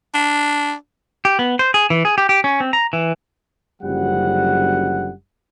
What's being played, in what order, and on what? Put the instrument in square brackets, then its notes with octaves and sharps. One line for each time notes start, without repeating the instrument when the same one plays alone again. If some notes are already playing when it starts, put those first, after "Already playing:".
[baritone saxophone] D4
[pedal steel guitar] G4
B3
C5
G#4
E3
G#4
G4
G4
C#4
C4
A#5
E3
[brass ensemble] F#1 F#2 D3 F3 G3 F#5